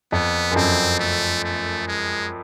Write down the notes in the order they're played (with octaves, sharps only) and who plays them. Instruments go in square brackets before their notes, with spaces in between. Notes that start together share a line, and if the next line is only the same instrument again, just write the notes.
[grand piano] F2 [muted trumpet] B3
[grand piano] F#2
[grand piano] F2 [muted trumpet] C4
[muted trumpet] A3
A3
G#3